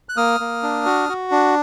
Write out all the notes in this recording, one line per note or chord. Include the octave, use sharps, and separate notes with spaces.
F#6
A#3 D#6 F6
A#3
D4
F#4
F#4
D4